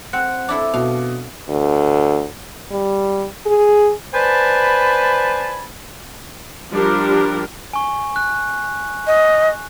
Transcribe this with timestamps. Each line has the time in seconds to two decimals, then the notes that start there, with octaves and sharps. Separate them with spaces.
0.13 C4 F#5 F#6 C#7
0.49 D4 E4 A4 D6
0.73 B2 F5
1.49 D2
2.72 G3
3.46 G#4
4.14 B4 C5 D5 G#5 A5 B5
6.72 F3 G3 D4 G4 A#4
7.73 G#5 C#6
8.16 F#6
9.07 D#5